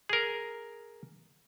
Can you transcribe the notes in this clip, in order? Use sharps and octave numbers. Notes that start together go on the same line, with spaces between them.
G#4 A#4